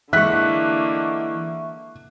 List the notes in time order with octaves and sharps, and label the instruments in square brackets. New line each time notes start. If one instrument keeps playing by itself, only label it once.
[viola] D3 A#3 [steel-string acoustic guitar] E3 G#3 [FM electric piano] E5 C#6 [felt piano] F#6 B6